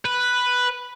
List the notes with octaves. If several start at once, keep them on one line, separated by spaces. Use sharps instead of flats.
B4